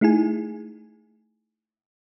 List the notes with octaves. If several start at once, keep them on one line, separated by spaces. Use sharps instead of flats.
A3 D#4 E4 G#4 G#5